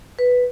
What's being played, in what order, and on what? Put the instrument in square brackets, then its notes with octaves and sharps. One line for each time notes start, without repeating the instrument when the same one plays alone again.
[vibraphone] B4